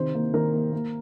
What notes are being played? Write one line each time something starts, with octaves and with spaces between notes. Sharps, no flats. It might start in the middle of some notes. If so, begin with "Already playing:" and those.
Already playing: C3 D#3 C5
A#3
D#3 A#4
A#3
A#3